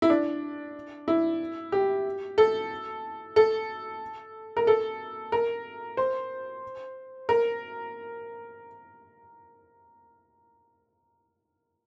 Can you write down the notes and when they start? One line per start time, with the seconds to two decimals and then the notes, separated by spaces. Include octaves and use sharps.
0.02 E4
0.10 D4
1.08 E4
1.72 G4
2.38 A4
3.36 A4
4.57 A#4
4.67 A4
5.32 A#4
5.97 C5
7.29 A#4